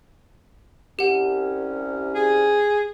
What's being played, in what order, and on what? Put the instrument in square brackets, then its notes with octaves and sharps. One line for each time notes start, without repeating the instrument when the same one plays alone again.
[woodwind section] C2 C#4 [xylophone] G4 F#5
[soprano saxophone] G#4